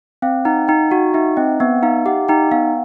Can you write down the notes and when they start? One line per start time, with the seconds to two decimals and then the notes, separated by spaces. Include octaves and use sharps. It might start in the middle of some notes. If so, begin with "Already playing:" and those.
0.22 C4 F5
0.45 D#4 F#5
0.68 D#4 G5
0.91 F#4 F#5
1.14 D#4 E5
1.37 C4 D#5
1.60 B3 E5
1.83 D#4 F5
2.06 G4 F#5
2.28 D#4 G5
2.51 B3 F5